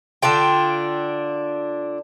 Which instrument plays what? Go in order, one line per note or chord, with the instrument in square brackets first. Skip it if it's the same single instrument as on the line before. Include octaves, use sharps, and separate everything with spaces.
[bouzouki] D3 D4 F4 G5